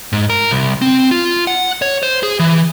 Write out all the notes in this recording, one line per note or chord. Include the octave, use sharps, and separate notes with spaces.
G#2
A#4
C2
C4
F4
F#5
C#5
C5
G#4
E3